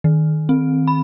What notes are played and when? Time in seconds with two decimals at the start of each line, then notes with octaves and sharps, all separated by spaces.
0.04 D#3
0.49 C4
0.87 B5